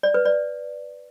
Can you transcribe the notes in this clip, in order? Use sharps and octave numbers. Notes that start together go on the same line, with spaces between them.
D5
B4
D5